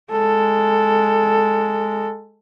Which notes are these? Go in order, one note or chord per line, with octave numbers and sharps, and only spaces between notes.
G#3 A4